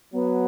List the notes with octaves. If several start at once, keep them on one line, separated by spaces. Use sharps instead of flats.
F#3 B3